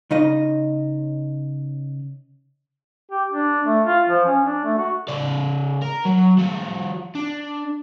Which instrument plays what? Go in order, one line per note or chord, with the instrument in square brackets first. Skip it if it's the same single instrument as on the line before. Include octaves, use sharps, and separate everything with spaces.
[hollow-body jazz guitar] C#3 D#4 D#5
[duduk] G4
D4
A3
F4
F3
C#4
D4
A3
F#4
[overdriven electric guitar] C#3 D5
A#4
F#3
F3 F#4
D4